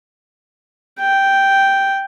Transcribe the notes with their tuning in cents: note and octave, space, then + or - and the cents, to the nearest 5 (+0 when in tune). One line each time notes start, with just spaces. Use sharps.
G5 -5